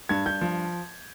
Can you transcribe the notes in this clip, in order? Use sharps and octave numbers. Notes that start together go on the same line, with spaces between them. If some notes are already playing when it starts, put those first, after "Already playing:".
G2 G#6
G2 G6
F3